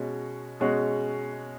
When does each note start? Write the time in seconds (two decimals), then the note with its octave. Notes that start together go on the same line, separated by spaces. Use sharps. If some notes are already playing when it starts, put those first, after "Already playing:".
Already playing: B2 G#3 C#4 F#4
0.60 B2 G#3 C#4 F#4